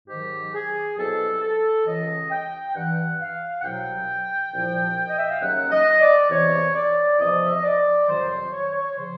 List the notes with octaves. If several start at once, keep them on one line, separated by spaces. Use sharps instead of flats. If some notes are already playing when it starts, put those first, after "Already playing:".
G#2 D#3 F#3 G4
G#4
C2 B2 F#3 A4
A4
C#2 C#3 E3 D#5
G5
G2 E3 F#5
F5
F#5
C2 B2 F#3 G5
C2 A#2 F3
D#5
E5
F5
D#2 C#3 F#3 F#5
D#5
D5
E2 C3 E3 C#5
D5
E2 C3 F3 D#5
E5
D#5
D5
F2 C3 D#3 F#3 C5
C5
C#5
C#5
C#3 F3 C5